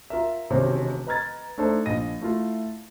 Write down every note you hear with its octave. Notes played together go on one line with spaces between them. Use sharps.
F4 A#4 E5
E1 C3 D#3 C#4 C5
B4 D#5 A#5 F6 G#6 A6
A3 D4 D#4 A4 C5
A#1 D#5 A#6 D#7
A3 E4 F4